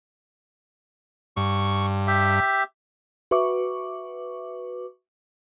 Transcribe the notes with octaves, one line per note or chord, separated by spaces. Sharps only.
G2 C#6
G4 E5
F#4 B4 E5 C#6 D6